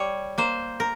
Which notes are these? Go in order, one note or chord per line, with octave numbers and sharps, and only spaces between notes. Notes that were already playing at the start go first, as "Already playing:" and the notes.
Already playing: G3 C#5
A#3 C5
A#4